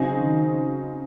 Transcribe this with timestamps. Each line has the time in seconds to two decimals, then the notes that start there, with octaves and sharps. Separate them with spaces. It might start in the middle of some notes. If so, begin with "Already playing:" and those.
Already playing: C#3 F#3 C4 D#4 G#4
0.21 D#3